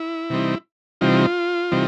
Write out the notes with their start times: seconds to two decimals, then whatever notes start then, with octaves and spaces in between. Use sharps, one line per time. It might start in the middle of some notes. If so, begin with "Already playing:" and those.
Already playing: E4
0.30 C3 E3 G3 C4 D#4
1.01 C3 E3 G3 C4 D#4 F4
1.72 C3 E3 G3 C4 D#4